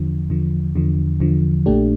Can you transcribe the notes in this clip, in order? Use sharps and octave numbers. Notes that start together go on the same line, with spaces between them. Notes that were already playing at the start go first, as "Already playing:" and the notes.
Already playing: E2 D3 F3
E2 D3 F3
E2 D3 F3
E2 D3 F3
A#1 A#2 A3 D4 G4